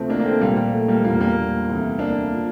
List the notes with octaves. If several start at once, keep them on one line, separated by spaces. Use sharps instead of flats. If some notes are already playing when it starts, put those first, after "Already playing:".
Already playing: D2 C3 F3 A3 C4
A#3 D4
A#3
A3 C4
A#1 A#2 F3 G3 A#3
G3
A3
G3 A#3
E1 E2 D3 F3 G3 A#3
G3 A#3
D2 C3 E3
A#3 D4
F3